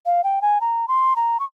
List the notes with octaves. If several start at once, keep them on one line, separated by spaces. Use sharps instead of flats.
F5
G5
G#5
A#5
C6
A#5
C#6